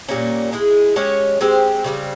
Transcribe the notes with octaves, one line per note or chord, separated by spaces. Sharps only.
A#2 G3 A#3 C#4
G#3 E4 G#4
G#3 C#4 G4 C#5
G#3 C4 G4 C5
C#3 G3 C4